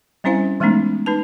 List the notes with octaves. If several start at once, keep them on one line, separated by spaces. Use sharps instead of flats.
G3 C4 C#4 E4 C5 F5
E3 G#3 A3 B3 C#4 D#4
D#4 B4 A5